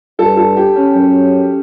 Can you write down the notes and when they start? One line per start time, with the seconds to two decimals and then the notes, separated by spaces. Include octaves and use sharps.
0.19 G2 A4
0.37 A4
0.57 G4
0.76 C#4
0.96 F#2